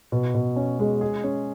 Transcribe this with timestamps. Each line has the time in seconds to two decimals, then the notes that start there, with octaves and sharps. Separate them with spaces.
0.12 B2
0.34 B2
0.56 C#4
0.79 G#3
1.01 G#4
1.24 C#4